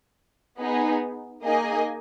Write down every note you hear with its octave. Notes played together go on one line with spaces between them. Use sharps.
B3 D#4 G#4
A#3 D#4 G#4 D#5 G#5